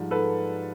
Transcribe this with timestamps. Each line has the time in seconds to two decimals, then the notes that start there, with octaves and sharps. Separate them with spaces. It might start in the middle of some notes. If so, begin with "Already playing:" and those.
Already playing: G#2 F3 G3
0.11 G#2 A4 B4